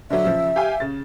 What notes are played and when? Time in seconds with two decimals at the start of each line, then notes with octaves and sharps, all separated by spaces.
0.10 D3 F#3 E5
0.24 C#3 F3
0.56 G4 F5 G#5
0.80 C#3 A6